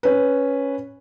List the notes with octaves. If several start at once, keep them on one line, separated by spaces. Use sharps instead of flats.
C#4 B4